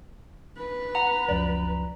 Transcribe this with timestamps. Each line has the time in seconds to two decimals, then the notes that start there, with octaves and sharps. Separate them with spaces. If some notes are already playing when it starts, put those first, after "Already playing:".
0.57 B4
0.95 F#5 A#5
1.28 C#2 F#2 F3 D5